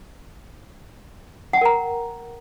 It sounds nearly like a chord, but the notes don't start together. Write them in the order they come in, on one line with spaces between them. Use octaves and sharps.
F#5 G5 A#4 A#5